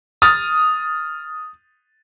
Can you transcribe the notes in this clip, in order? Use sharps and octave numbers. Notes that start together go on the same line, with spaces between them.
D#6 F6 A6